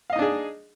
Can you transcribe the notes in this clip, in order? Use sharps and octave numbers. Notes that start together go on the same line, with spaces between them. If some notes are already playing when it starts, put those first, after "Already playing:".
D4 D#4 G#4 D#5 F5